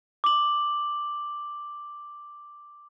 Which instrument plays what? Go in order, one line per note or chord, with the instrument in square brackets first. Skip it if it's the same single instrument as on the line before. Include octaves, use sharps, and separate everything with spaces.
[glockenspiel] D6 F#7